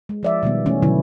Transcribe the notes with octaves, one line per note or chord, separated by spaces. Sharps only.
G#3
F3 D5 E5
B2 D#3 G3 B3
E3 A3 C#4
B2 D3 D#3 F#3 E4